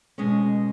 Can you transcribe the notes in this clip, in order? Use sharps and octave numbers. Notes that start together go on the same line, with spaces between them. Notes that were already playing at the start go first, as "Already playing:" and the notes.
B2 G#3 C#4 G#4